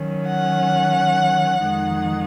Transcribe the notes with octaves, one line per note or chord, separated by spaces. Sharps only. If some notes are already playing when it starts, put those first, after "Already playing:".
Already playing: D#3 F#3 C#4
F#5
F2 D#3 G#3 D#4